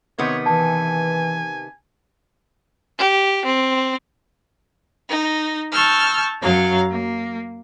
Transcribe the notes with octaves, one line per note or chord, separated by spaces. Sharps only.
C3 D#3 B3 C#5
E3 G#5 A5
G4
C4
D#4
A5 C#6 E6 F6 G6
F#2 F#3 F5
A#3